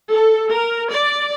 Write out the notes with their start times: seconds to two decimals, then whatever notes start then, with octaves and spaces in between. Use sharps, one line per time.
0.11 A4
0.50 A#4
0.89 D5